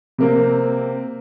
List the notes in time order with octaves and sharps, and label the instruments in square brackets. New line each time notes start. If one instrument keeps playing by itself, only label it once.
[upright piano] C3 A#3 C4